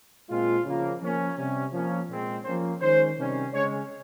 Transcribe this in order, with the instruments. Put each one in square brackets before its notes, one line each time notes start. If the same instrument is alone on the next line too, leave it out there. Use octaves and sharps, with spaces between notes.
[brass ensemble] A#2 G#3 C4 F4
C#3 F3 A#3
F3 A#3 C#4
C3 G3 C#4
F3 A#3 C#4
A#2 G#3 C4
F3 A#3 C#4 C5
D#3 G#3 C#4 C5
C3 D#3 G3 C#4
C#3 G#3 C#4 C#5